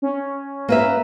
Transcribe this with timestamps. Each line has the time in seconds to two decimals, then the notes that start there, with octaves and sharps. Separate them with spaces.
0.02 C#4
0.68 A#3 B4 E5